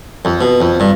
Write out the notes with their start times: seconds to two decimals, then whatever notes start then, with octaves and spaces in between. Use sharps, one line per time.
0.25 F2
0.41 B2
0.60 F2
0.80 G2